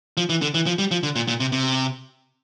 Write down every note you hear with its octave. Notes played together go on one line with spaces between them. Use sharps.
F3
E3
D3
E3
F3
G3
F3
D3
A#2
A#2
C3
C3